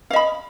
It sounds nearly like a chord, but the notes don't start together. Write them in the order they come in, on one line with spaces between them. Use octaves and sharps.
F5 D#5 B5